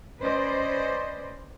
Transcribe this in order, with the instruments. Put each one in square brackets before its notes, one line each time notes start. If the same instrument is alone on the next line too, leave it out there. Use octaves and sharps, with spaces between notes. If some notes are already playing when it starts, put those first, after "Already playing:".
[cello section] C#4 B4 C5 D5 D#5